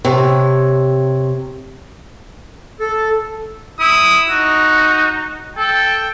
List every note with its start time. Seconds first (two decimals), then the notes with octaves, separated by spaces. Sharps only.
0.05 C3 C#5
2.80 A4
3.80 E4 D#6
4.30 D#4 F#4
5.57 A4 G5